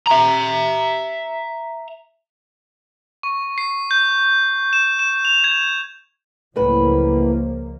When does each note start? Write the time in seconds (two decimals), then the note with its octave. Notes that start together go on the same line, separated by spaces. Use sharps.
0.07 E5 A#5
3.23 C#6
3.58 C7
3.91 G6
4.73 E7
4.99 E7
5.25 F7
5.44 G#6
6.56 C#2 F#2 A2 F3 A#3 B4